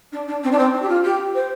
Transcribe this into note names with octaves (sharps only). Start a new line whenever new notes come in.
D4
D4
C4
D4
C4
D4
G4
F4
G4
C5